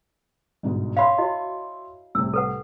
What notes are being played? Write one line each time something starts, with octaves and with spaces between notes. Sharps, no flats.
G1 G#2 B2
C#5 E5 F5 B5 C6
E4 F#4 D#5
C2 A2 C3 E6
A4 B4 F#5